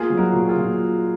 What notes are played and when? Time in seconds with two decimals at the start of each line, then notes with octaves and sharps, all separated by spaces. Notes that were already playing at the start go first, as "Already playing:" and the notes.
Already playing: A#3 F4 G#4
0.10 F#3
0.17 F#4 A#4
0.33 A#2
0.48 F4 G#4
0.56 A#2